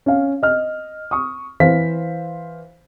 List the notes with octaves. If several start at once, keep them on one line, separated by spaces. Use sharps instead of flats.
C#4 F5
D#5 F6
C#6 D#6
E3 C5 F5 B6